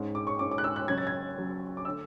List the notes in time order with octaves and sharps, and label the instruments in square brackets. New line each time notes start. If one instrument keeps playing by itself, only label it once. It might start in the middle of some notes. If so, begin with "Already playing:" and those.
Already playing: [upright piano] G#2 G#3 C#4
D6
C#6
G#2 G#3 C#4 D6
D6
F#6
E6
F#6
C#3 F#3 C#4 G#6
A6
G#6
C#3 F#3 C#4
D6
D3 A3 E6